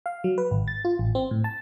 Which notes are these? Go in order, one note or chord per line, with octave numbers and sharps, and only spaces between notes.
F5
F#3
B4
G#1
A6
F4
A1
C4
A2
A5